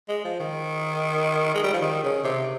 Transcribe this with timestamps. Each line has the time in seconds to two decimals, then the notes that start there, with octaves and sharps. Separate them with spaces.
0.08 G#3
0.24 F3
0.40 D#3
1.54 G#3
1.63 G3
1.73 F3
1.81 D#3
2.04 C#3
2.24 C3